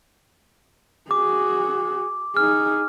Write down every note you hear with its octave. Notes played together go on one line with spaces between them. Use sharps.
F#4 G#4 D6
D#4 G#4 F6